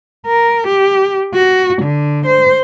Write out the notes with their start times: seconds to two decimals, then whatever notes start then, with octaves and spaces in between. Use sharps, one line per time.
0.27 A#4
0.67 G4
1.34 F#4
1.82 D3
2.26 C5